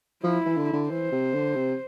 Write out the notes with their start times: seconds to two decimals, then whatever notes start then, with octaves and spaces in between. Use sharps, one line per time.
0.24 F3 E4
0.46 E3
0.57 D3
0.73 D3
0.89 E3 C5
1.12 C3
1.34 D3
1.55 C3